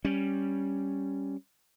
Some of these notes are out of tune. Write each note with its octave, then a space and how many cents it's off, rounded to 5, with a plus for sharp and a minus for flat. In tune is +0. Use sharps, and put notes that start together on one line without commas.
G3 +0 C#4 +0